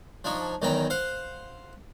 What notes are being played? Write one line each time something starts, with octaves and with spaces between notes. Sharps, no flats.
F3 D4 D#4 C#5
E2 D#3 E3 F#3 G5 A#5
C5 F5 F#5